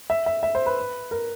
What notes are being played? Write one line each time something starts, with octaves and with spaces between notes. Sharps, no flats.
E5
E5
E5
C5
B4
A#4